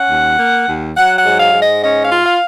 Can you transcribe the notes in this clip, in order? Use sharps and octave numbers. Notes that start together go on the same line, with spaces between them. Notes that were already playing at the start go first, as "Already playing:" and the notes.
Already playing: C#4 F#5
D#2
A#3
D#2
F#3 F#5
F#5
G#2
F5
G#2
D#5
C#4 D#5
F5
F4
F5